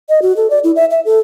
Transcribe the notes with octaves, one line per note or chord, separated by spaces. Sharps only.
D#5
F#4
A4
D5
E4
E5
E5
A4